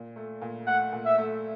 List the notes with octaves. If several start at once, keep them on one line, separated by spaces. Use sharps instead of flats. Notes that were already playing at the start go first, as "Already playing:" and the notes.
Already playing: A#2
A3
A#2
A3 F#5
A#2
E5
A3